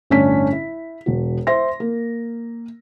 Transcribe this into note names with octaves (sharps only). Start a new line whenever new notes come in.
G1 A2 C#4 D4 B6
E4
E1 F#4
C5 E5 C6 A#6
A#3